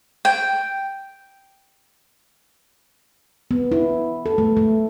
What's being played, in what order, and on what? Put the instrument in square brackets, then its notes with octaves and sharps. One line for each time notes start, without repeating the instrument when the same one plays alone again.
[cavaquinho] G5
[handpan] B3
E4
A4
A3
A3